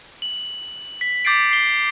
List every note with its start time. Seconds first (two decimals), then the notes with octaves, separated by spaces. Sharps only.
0.22 F#7
1.01 B6
1.25 D6 G6 A6 B6 C7 D7
1.51 C7 G7